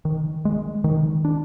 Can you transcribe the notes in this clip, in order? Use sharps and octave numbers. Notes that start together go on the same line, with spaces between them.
D#3
G#3
D#3
D4